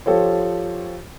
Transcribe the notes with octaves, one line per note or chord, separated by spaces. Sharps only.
F3 F4 G4 A4 C5 C#5